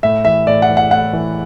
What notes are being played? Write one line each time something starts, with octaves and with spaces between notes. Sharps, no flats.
A2 E5
E3 E5
A2 D5
F#5
E3
F#5
A2 F#5
E3